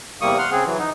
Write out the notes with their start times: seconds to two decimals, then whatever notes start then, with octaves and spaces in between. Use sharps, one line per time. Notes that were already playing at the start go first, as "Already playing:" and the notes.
0.21 E2 C3 G3 A#3 C#6 D#6
0.38 F#5 C6 F6
0.51 C#3 C4 G#4
0.65 E3 F#3
0.79 D#4